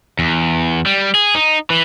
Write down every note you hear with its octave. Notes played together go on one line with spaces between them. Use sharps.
E2
G3
G#4
D#4
E3